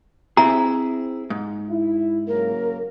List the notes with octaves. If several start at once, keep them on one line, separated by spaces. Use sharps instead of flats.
C4 E4 G#4 A#5
G#2
E4
C#3 F#3 A#3 A#4